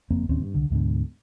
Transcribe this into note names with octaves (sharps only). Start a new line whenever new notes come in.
F#1 F2 A#3 C4
D1 D#2 C4 C#4
G2
C2 D3
D2 G#2 B2 D3